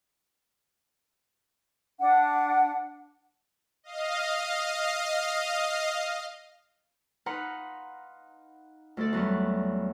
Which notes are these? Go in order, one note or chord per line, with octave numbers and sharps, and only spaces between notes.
D4 F#5
D#5 F5
D#4 B4 F5 F#5 A#5 C6
D2 A3 A4 D5
E2 F#3 G3 F#5